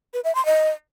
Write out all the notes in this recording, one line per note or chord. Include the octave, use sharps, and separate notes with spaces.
B4
E5
C6
D#5